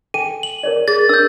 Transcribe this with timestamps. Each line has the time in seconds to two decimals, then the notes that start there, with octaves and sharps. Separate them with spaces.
0.14 A4 G5 G#5 D#7
0.43 F#7
0.63 A#4 C#5 D5
0.88 G#4 A6
1.09 D4 A#4 D#6 E6 G6